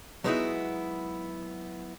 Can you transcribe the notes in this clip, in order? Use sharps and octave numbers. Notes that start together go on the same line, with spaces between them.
F#3 G#3 B3 D#4 E4 F#4